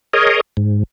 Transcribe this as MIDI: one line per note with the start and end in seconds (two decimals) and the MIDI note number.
0.13 0.41 68
0.13 0.41 70
0.13 0.41 73
0.13 0.41 75
0.57 0.83 44